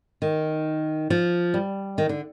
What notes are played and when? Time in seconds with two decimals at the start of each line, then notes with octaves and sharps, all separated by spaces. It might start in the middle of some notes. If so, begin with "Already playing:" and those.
0.22 D#3
1.10 F3
1.54 G3
1.98 D#3
2.09 D3